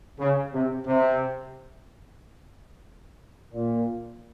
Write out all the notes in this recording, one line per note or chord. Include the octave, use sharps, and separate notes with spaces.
C#3
C3
C3
A#2